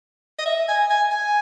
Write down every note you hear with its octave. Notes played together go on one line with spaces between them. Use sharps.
D#5
E5
G#5
G#5
G#5